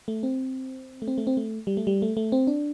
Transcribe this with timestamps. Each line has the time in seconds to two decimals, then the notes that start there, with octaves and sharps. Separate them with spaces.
0.08 A3
0.23 C4
1.02 A3
1.08 C4
1.18 A3
1.27 C4
1.37 A3
1.67 G3
1.77 A3
1.87 G3
2.02 A3
2.17 A3
2.32 C4
2.47 D4